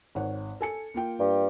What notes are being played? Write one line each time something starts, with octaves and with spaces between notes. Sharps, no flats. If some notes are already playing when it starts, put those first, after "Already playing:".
G#1 C#5 F#5
A4 G#5 C#7
A#3 F4 G5
G2